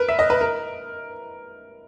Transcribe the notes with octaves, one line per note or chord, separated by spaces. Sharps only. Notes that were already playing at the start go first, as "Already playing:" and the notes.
Already playing: A#4 B4
E5
D#5
B4
A#4